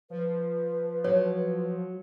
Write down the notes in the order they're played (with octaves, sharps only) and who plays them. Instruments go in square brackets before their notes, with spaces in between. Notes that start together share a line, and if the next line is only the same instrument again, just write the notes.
[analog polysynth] F3 [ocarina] B4
[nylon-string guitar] F#3 [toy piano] C#5